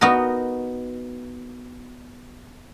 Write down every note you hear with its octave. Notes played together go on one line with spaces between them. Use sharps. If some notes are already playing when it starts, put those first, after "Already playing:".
B3 D#4 F#4 A#4